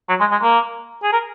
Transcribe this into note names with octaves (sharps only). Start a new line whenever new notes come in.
F#3
G#3
G#3
A#3
G#4
A#4